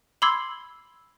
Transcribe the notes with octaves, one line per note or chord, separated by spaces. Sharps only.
B5 C6 D6 E6 G#6 C7